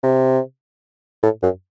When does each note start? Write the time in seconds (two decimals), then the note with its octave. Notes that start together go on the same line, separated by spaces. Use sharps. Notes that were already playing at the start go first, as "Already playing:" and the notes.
0.03 C3
1.23 A2
1.42 F#2